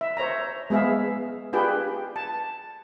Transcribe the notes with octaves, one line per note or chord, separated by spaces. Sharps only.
E5
C5 C#5 E5 A#5
G#3 B3 G#4 E5 F5
D4 F4 G4 G#4 B4 G5
A5